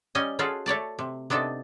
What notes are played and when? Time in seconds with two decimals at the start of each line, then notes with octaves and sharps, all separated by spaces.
0.15 G3 C#4 D#5 G#5
0.39 C#4 F4 F#4 G#4 A4
0.66 A3 C#5 D5 A5
0.99 C3
1.30 C3 B3 D4 D#4 A4